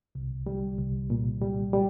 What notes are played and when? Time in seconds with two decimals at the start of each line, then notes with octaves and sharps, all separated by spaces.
0.15 C2
0.46 G3
0.78 C2
1.10 A#2
1.41 G3
1.73 G3